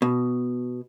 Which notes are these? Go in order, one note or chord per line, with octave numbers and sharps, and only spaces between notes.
B2